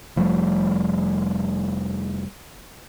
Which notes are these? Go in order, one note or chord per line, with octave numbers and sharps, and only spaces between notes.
F1 F3 G3 A3